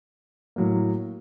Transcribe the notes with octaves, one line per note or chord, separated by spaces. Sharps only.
A2 F#3 A#3